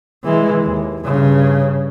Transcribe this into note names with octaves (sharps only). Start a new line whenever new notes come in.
E3 G#3
D#2
G2 C#3